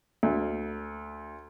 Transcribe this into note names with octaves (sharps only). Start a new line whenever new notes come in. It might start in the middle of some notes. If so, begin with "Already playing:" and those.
D2